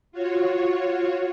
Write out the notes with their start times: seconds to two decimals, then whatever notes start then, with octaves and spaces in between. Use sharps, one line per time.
0.12 F4 F#4 C#5